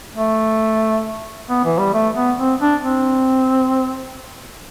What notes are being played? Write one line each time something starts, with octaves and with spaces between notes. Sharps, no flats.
A3
B3
E3
G3
A3
B3
C4
D4
C4